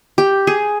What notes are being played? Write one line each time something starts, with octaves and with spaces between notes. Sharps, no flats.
G4
G#4